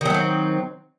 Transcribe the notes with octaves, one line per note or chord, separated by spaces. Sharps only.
D#3 F#3 A3 C4